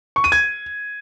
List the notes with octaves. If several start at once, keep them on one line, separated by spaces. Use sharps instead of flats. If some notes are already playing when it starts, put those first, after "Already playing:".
C#6
D#7
G#6